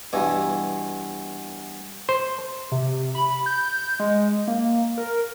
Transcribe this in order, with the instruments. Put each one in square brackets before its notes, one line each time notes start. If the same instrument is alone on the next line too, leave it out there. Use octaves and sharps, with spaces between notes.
[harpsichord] G2 B2 E3
[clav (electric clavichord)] C5
[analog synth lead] C3
B5
G6
G#3
A#3
A#4